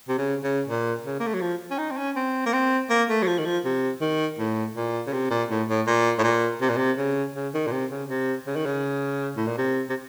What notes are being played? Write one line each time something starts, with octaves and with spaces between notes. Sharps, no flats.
C3
C#3
C#3
A#2
C#3
A#3
A3
F#3
F3
C#4
D#4
C4
C#4
C4
A#3
C4
A#3
A3
F#3
F3
D#3
F3
C3
D#3
A2
A#2
C#3
C3
A#2
A2
A2
A#2
A2
A#2
C3
A#2
C3
C#3
C#3
D#3
A#2
C3
C#3
C3
C#3
D#3
C#3
A2
A#2
C3
C3